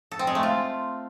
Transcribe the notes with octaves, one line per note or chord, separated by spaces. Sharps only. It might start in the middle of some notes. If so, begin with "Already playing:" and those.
A4
C4
G#3
A3
F4